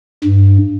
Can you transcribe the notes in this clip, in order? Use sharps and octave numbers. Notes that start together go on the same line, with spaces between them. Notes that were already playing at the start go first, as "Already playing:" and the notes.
G2